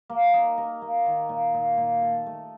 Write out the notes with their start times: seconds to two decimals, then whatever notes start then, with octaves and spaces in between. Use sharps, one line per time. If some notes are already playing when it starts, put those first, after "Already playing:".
0.09 A#3
0.33 D#4
0.58 A#4
0.82 A#3
1.06 D#3
1.29 A#2
1.54 A#2
1.77 A#2
2.02 A4
2.26 A3